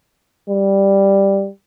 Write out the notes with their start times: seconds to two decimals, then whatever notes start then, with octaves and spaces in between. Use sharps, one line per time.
0.50 G3